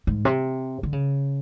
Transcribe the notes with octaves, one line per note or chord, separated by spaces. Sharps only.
G#2
C3
D3
C#3